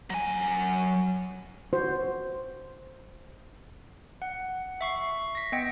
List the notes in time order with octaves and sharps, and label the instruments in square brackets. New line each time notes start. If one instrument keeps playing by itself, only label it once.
[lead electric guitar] F#3 G#5
[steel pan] F#4 C5
[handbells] F#5
E5 C#6 C7
A#6 B6
B3 D#5 G5 C#7